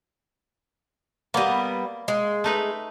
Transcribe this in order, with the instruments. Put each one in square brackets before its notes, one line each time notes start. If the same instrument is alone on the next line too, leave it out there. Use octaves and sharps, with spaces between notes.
[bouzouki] G3 B3 [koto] A#3 D#5
[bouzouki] G#3
[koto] A3 D#4 B4